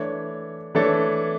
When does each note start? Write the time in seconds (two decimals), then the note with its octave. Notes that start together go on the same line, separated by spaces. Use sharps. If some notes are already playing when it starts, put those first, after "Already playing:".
Already playing: E3 A3 D4 A4 C#5
0.75 E3 A3 D4 A4 C#5